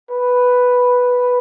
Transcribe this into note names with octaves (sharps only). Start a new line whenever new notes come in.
B4